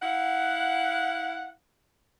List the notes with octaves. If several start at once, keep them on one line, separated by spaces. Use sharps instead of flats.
E4 F5 F#5